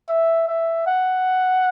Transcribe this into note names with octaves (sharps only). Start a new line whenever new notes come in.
E5
E5
F#5